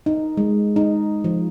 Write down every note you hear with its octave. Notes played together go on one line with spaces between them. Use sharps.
D#4
G#3
D#4
F3